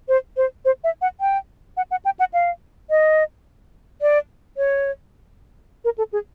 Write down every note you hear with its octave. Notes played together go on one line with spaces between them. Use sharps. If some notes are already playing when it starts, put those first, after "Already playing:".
C5
C5
C5
E5
F#5
G5
F#5
F#5
G5
F#5
F5
D#5
D5
C#5
A#4
A4
G#4